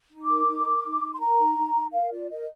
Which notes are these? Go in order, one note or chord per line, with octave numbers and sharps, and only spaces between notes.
D#4
D6
A#4
D#4
A#4
D#4
D#4
C6
A#4 A#5
D#4
D#4
D#4
A#4 F5
F4 D5
A#4 D#5